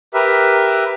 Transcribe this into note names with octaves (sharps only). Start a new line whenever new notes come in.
G4 A#4 B4 E5